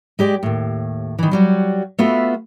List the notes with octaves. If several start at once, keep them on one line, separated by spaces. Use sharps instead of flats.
G#3 G4 D5
D#2 A2
D#3 E3
F#3 G3 F#4
A3 B3 F4 F#4 B4 E5